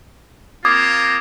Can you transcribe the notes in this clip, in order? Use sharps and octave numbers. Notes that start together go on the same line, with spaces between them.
A#3 C4 F4 D6 D#6 G#6